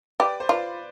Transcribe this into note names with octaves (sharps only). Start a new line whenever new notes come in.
G4 B4 D5
C5
F4 B4 D5